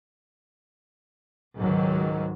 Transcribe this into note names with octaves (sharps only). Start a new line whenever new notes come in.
C#2 G#2 D#3 F#3